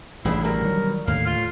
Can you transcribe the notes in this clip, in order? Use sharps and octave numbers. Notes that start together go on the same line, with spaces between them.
A1 C#3 E3 G#3 D4 E4
B2 G3 A#4
D#3 F#3
D#2 A2 D3 F5
F4